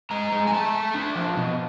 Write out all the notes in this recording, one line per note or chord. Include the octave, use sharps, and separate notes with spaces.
G#3 A#5
G#3
G#5
A3 A5
A3
D4
F3
B2